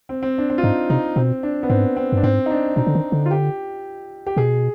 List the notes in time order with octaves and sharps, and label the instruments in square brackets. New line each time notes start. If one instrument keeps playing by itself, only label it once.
[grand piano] C4
C4
D4
C4
F4
[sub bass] G#2 [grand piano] D#4
[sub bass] C3 [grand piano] D#4
[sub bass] B2 [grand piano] C4
[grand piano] D4
B3
[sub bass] G#2 [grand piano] C4
[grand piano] C4
[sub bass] G2 [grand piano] D4
[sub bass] G#2 [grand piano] C4
[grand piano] D#4
D4
[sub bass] B2 [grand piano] D#4
[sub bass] D3
D#3
D3
[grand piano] F4
G4
G4
[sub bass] B2 [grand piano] G#4